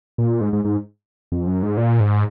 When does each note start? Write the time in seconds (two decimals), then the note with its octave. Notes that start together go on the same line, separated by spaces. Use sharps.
0.18 A#2
0.41 G#2
0.53 G#2
0.65 G#2
1.32 F2
1.47 F#2
1.63 G#2
1.77 A#2
2.00 G#2